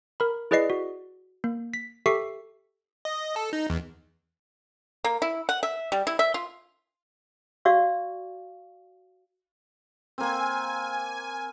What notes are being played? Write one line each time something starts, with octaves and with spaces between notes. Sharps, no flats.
A#4 B5
E4 G#4 B4 D5 D#5 C7
F#4
A#3
B6
G4 A4 E5 C#6 B6 C7
D#5
A4
D#4
E2
A#3
E4
F#5
E5
G3
E4
E5
F4
F#4 D5 F5 C#6
A#3 C4 G#5